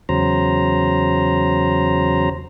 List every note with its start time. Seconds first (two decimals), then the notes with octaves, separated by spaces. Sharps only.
0.09 E2 C#3 F#3 C5 A#5